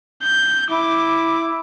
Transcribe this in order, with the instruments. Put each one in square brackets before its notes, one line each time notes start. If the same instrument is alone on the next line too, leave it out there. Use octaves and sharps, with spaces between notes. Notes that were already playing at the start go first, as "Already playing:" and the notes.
[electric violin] G6
[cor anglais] E4 [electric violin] D6